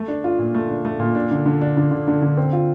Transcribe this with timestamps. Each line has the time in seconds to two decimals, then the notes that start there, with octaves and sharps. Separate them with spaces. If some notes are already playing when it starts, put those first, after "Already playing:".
Already playing: A3
0.08 D4
0.24 F4
0.39 A#2
0.55 A3
0.69 D4
0.85 A3
0.99 A#2
1.15 D4
1.31 D3
1.46 D3
1.61 D4
1.77 D3
1.91 D3
2.08 D3
2.22 D3
2.37 C4
2.53 F4